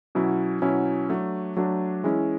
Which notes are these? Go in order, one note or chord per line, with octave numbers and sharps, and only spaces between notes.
B2 F#3 C#4 E4
B2 F#3 C#4 E4
F#3 A3 D4
F#3 A3 D4
E3 G#3 C#4 E4